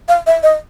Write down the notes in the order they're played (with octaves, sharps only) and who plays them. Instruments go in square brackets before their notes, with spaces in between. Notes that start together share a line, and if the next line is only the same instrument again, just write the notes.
[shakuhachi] F5
E5
D#5